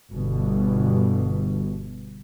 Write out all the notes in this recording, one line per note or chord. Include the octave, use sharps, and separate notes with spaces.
G1 B2